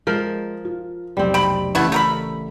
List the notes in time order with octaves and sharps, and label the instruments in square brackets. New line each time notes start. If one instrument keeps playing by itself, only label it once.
[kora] F3 A#4 [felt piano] G#3
[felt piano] F4
[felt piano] F1 B1 [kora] G3 C4
[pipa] G5 B5
[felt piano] A1 C#3 [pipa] A3 B3 E4
[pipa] A3 A#4 B5